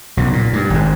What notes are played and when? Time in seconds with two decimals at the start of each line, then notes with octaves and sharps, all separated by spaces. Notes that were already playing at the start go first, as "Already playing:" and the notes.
0.17 B1 C#3
0.33 A#2
0.53 G2
0.70 G#1 G#2